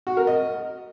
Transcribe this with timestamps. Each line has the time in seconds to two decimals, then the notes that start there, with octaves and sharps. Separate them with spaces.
0.07 F#4
0.17 A#4
0.27 D#5